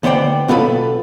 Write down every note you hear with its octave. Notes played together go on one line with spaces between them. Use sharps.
D2 B3 C5 D5 G5
B1 B3 F4 A4 B5